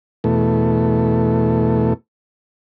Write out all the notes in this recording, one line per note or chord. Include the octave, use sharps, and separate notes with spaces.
E2 B2 A3